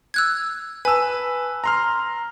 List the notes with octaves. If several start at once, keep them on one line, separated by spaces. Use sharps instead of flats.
E6 F#6 G#6
B4 G#5 A5 E6
A#5 C6 F6